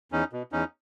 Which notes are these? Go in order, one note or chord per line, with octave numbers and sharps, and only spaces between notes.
E2 C#4 D#4
B2
E2 C#4 D#4